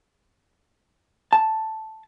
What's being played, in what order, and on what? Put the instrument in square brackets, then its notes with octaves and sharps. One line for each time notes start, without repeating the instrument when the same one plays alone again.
[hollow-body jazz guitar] A5